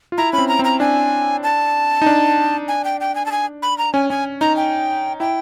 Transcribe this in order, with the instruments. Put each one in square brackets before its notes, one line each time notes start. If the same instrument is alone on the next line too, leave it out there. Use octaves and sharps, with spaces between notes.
[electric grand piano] F4
[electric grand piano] E4 [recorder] A#5
[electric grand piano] C#4 [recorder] B5
[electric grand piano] C4
[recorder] A#5
[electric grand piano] C4
[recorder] A#5
[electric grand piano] D4 [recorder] G#5
[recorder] A5
[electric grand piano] D#4
D4
[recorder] G#5
G5
G5
G#5
A5
G#5
B5
A#5
[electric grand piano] C#4 [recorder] G#5
[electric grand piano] C#4 [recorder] G#5
[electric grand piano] D#4 [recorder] A#5
[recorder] G5
[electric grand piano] E4 [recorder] G5